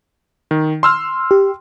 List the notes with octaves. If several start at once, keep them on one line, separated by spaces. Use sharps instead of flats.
D#3
C6 E6 F6
G4